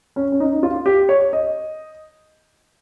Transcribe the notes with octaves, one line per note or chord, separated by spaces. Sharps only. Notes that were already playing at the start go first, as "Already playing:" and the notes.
C#4
C#4
D#4
F4
G4
C#5
D#5